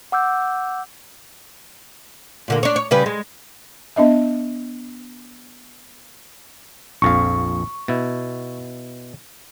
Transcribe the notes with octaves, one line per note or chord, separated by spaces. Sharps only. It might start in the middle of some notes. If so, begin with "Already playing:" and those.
F#5 D6 E6 G6
A#2 D3 A#3
D4 C#5
C#5
C#3 G3 B4
G#3
B3 D4 D#5 E5
A#1 F2 F5 C#6
B2 E4